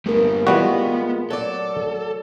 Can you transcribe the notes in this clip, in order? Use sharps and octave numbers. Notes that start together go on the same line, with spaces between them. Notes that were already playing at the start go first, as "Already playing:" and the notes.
G3 A3 B3 A#4
E3 G3 G#3 B3 F4 F#4
F#3 A4 D5